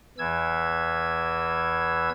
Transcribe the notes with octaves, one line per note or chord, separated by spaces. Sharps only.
E2 E3 E6 G#6